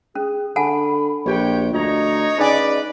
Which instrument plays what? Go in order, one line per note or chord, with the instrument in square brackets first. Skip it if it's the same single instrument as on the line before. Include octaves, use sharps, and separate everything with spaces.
[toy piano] C#4 [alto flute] G#4
[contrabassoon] D3 [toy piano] F#5 G#5 A5 [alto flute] B5
[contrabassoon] A#1 [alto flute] G4 [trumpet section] B4 C#5 G5
[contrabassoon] D2 [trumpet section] D#4 C#5 A#5 [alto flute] D#5
[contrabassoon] C#3 [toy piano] D#4 G#5 [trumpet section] B4 D5